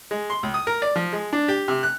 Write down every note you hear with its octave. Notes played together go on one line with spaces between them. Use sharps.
G#3
C6
C#2
D#6
A#4
D5
F3
G#3
D4
G4
C3
F#6